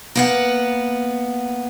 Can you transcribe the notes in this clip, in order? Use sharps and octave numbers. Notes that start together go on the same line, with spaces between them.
A#3 B3 F#5